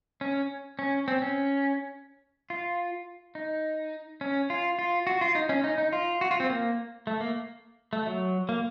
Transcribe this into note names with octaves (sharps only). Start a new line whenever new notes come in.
C#4
C#4
C4
C#4
F4
D#4
C#4
F4
F4
F#4
F4
D#4
C#4
D#4
D#4
F4
F#4
F4
C4
A#3
A3
A#3
A3
F#3
A#3